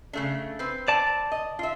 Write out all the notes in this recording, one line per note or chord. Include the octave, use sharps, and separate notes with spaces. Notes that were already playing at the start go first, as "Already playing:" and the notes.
C#3 A3 D4
C4 B4
D5 A5
D#5
F4 E5